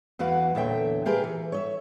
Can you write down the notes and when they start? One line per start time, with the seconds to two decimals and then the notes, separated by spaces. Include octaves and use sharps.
0.19 E2 E3 F#4 B4 F5
0.55 E2 A#2 D3 C#5 E5 G5
1.06 F4 G4 G#4 A#4 B4
1.24 E3
1.52 C#5 D#5 E5